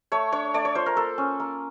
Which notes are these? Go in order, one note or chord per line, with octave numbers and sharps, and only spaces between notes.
A3 C#5
D4 C#5
A3 D5
C#5
F4 C5
A#4
A#3 A4
C#4
A#3